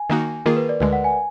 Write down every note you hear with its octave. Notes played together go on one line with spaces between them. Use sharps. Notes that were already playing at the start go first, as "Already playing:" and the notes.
Already playing: G#5
D#3 A#3 D#4 F#4
D#3 A#3 F4 G#4 A#4
B4
D5
D2 D3 G#3 B4
F#5
G#5